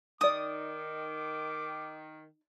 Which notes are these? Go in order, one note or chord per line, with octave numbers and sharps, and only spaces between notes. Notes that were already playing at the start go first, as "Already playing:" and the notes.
D#3 D#4 D5 D6 D#6